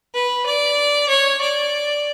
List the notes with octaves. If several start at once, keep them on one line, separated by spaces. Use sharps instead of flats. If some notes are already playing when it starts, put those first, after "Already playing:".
B4
D5
C#5
D5